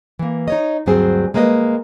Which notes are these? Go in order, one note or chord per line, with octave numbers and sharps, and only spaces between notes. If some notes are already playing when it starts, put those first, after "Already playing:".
E3 A#3
D#4 C#5 D#5
D2 G2 F#3 C4 G#4 C5
G#3 A#3 B4 D5 D#5